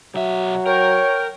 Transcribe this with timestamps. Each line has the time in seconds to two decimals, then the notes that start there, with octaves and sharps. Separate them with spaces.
0.15 B1 F#3 E5
0.66 A#4 C#5 G5